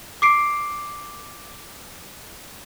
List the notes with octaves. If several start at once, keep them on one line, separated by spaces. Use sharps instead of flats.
D6 C7 D7